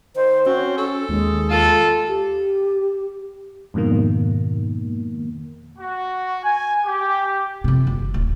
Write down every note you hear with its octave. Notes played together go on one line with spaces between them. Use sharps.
D#3 C5
C4 C#4 F#4
A4
D#2 G#3
F4 A4
G4
F2 G#2 B2 D#3 A#3
F#4
G#5
G4
F2 C3
F#1
D1